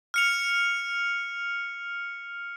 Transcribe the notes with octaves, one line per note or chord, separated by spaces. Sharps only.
F6 C#7 F7